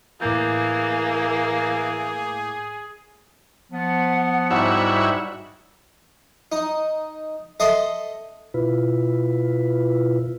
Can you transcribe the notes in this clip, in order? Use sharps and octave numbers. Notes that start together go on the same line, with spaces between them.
A2 E3 A#3 G#4 D6 G6
F3 B3 F#5
G#2 G3 E4 F#4 C#5 E5
D#4
A4 D#5 E5 C6
B2 E4 F4 B4